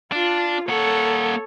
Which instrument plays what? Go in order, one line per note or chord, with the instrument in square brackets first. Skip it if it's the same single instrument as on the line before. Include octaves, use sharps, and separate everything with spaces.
[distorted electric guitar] D4 [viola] F4
[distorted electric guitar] A#3 F#5 [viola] A4 C#5